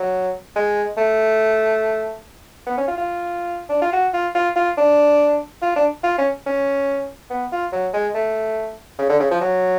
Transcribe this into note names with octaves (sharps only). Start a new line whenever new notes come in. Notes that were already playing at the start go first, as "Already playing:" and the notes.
Already playing: F#3
G#3
A3
B3
C#4
F4
F4
D4
F4
F#4
F4
F4
F4
D4
F4
D4
F4
C#4
C#4
B3
F4
F#3
G#3
A3
C#3
D3
C#3
F3
F#3